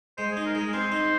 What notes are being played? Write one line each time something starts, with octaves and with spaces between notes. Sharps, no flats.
G#3 C5
G#4
D#4
A#4
G#3 G#4
C4 C5
D#4